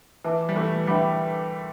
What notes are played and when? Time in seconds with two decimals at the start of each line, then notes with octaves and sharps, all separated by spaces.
0.24 E3 B4 E5 A5 D6
0.49 G3
0.56 E3 A3
0.87 D3 G3 B4 E5 G5 B5 D6